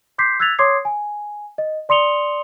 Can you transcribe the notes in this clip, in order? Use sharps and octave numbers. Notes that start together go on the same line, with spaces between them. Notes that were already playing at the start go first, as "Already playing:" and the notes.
C6 D6 G6 B6 C7
E6 F#6 G#6 A6 B6 F7
C#5 C6 D6 D#6 G#6 C7
G#5
D#5
D5 C6 D#6 C#7 F7 G7